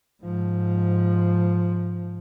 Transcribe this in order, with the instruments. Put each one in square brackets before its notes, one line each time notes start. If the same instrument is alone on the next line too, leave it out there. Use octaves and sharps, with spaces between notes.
[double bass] G#2 F3